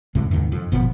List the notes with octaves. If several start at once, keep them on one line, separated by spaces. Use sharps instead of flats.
F2 A2 C3 G#3
D#2 G#2 C3 D#3
F2
F#1 A#2 F3 B3